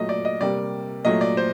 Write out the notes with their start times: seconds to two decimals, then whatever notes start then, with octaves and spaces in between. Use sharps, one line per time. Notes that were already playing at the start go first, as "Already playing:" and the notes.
Already playing: A#2 F#3 A3 D#5
0.09 D5
0.25 D#5
0.41 C3 G3 A#3 D5
1.05 A#2 F#3 A3 D#5
1.21 D5
1.37 C5